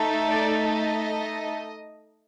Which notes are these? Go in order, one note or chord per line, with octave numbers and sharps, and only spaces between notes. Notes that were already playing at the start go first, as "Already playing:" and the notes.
Already playing: A3 D#4 A4
D5
D#5